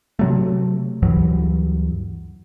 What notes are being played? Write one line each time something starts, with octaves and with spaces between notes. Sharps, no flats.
C3 F#3 A3
D2 G2 E3 F#3